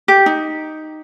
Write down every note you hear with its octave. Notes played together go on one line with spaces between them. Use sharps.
G4
D#4